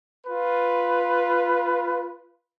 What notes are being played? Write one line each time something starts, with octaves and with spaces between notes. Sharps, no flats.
F4 B4